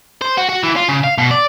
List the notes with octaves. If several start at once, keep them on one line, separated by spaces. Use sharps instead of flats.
C5
F#4
F#4
E3
F4
C#3
F5
B2
D5